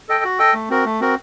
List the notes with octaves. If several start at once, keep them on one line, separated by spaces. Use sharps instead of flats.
A4 D#5 G5
F#4
A4 D#5 G5
A3
C4 F#4 A#4
A3
C4 F#4 A#4